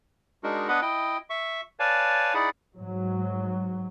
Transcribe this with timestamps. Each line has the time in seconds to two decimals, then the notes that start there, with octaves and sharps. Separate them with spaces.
0.44 G#3 D4 D#4 F#4 A#4
0.68 B3 D4 B4 D#5 F#5 B5
0.82 E4 D#5 G5
1.30 E5 C#6
1.80 B4 C#5 D5 F5 G#5 A5
2.34 D#4 E4 G#4 D5 F#5 B5
2.76 G#2 F#3